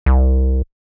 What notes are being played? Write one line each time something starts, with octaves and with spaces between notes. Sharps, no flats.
C2